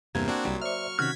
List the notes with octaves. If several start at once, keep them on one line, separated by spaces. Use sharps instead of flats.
E2 G2 C3 A#3 G#6
C4 D4 F#4 C6
C2 F#3 G3
C5 D5 E5 C#6 F6
C3 D#3 C#4 F#4 F6 G#6 B6